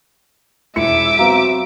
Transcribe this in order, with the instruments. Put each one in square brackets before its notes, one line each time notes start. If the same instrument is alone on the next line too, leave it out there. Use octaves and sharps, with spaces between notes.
[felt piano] E1 E4 C#7 [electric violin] E5 D6
[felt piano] F#3 B3 C4 [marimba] F#4 F5 A#5